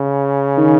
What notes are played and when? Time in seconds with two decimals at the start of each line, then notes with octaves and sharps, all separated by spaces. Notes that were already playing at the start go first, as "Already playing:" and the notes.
Already playing: C#3
0.57 D#3